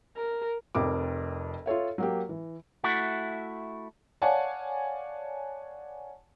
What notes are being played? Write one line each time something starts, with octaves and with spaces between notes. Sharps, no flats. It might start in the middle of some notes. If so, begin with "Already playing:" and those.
A#4
F1 F2 A#4 D6
F4 A4 C#5 E5
F#3 A#3 G4
E3
A3 E4 F#4
C#5 D5 F5 F#5 G#5 A5